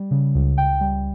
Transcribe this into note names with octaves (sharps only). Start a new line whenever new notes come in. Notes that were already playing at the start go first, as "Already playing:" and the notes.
Already playing: G3
C#3
C#2
C#2 G5
G3